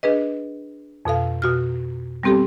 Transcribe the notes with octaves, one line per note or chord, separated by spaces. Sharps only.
D4 G#4 B4 D#5
F2 B2 A4 F5
B2 F#4 F6
G3 B3 C4 G4 A4